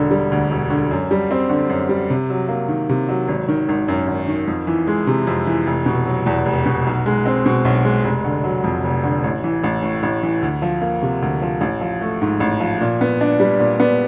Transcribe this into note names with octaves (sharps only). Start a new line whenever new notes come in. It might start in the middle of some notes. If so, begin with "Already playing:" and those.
Already playing: E1 D3
G3
D2
E1
D3
F#2
G3
C4
D3
F#2
G3
C3
F#3
A#3
D#3
C3
F#3
G#1
D#3
G#1
F#2
G#1
D#3
F2
E3
G#3
C3
F2
E3
F1
B2
F#3
E2
F1
B2
B1
G#3
C4
B2
B1
G#3
F1
D3
F#3
F2
F1
D3
A1
E3
A1
A2
A1
E3
D2
F3
A#3
C3
D2
F3
A1
F3
A3
G#2
A1
F3
A#2
B3
D4
G3
A#2
B3